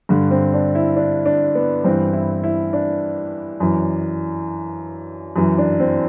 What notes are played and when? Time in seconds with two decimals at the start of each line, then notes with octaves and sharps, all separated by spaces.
0.09 G2 D3
0.31 C4
0.54 D4
0.75 E4
0.96 D4
1.26 D4
1.55 B3
1.84 G2 E3 C4
2.13 E4
2.44 E4
2.73 D4
3.60 F#2 E3
5.36 F#2 E3
5.58 D4
5.80 C4